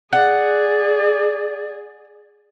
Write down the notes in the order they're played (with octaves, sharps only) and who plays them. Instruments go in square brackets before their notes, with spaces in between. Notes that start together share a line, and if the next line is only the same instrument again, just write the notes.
[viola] G#4 [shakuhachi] D5 [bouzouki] F#5